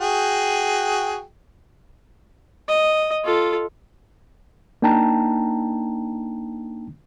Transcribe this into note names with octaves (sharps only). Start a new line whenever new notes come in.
F#4 G#4 G5
D#5
F4 A4
A#3 D4 D#4 G5 A5 A#5